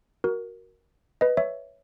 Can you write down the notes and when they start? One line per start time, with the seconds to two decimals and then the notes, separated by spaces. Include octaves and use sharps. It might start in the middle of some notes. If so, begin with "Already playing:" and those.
0.24 F#4 A#4
1.21 B4 D#5
1.37 C#5 E5